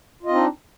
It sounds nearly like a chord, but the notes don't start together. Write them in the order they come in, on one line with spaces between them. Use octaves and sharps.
F4 D#5 C4 D#4 D4